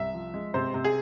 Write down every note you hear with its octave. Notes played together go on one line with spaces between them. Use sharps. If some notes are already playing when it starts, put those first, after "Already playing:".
Already playing: C2 E5
F3
G#3
C3 C5
C3
G#4